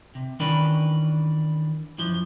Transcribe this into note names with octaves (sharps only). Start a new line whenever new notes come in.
C3
D#3 E3 C#4 D4 A#4 B4
F#2 E3 F3